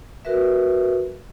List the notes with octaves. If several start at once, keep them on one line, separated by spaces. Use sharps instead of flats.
F#4 A#4 B4 E5